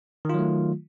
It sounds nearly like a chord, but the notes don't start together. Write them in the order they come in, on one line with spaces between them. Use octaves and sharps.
D#3 F4 F#3 A3